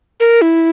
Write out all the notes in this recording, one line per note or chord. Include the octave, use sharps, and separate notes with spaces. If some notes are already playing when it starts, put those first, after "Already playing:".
A#4
E4